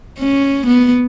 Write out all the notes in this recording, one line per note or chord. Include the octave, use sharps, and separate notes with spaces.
C#4
B3